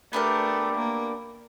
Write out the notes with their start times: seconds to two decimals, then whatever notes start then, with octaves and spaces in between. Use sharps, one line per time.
0.13 A3 B3 D4 G4 A#4
0.75 A#3